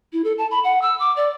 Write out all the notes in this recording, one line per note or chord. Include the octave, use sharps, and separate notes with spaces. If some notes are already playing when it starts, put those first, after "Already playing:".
E4
A4
A5
B5
F#5
E6
D6
D5